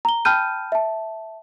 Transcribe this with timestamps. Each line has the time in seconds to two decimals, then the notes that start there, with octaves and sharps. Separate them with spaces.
0.05 A#5 G7
0.25 G5 A5 B5 F6 G6 D#7
0.72 E5 A5